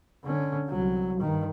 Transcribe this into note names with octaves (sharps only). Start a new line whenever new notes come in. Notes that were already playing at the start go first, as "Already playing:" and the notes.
D3 C#4
C2 F#3
G2 D#3